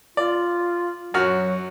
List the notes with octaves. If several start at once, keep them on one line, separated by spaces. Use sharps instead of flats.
F4 D5
F#2 F#3 F#4 F6